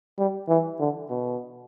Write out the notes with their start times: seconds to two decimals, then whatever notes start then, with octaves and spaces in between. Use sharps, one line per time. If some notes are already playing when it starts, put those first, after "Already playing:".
0.18 G3
0.49 E3
0.80 D3
1.10 B2